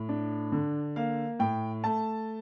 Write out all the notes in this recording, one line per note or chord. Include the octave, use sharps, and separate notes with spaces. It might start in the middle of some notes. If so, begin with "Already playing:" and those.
Already playing: A2
D4
D3
A#3 F5
A2 G5
A3 A5